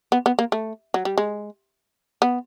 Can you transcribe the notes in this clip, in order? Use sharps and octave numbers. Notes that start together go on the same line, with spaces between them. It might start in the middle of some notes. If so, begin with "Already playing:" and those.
B3
B3
A#3
A3
F#3
G3
G#3
B3